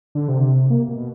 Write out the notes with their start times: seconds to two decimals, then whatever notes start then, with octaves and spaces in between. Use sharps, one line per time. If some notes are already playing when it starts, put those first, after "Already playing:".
0.15 D3
0.28 C3
0.70 A#3
0.88 B2